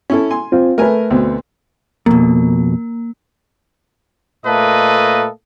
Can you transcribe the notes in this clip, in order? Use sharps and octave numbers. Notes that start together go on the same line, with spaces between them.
C#4 E4 A4
G#5 C6
C4 F4
A3 A#4 B4 G#5
D2 B2 C4
F2 B2 A#3
A#2 A3 A#3 A4 B4 D#5